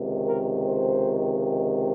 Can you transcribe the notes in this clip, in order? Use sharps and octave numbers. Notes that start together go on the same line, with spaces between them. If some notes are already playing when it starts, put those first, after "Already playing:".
Already playing: C#2 C3 D#3
A#4
C5